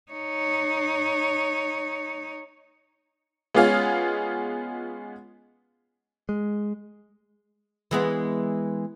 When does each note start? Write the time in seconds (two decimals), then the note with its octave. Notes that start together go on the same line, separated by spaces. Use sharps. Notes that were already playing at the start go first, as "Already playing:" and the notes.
0.12 D#4 C#5
3.54 G#3 B3 C#4 F4 G#4 F5
6.29 G#3
7.91 E3 G#3 B3